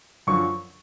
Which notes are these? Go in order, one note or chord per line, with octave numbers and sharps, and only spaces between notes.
F#2 D3 F3 C#6